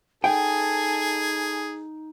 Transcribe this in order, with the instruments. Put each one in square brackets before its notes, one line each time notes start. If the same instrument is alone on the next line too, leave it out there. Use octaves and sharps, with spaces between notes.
[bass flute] D#4 [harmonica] G#4 [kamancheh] A4 G#5 [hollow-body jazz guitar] G5